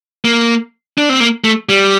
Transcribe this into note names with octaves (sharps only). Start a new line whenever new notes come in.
A#3
D4
C4
A#3
A3
G3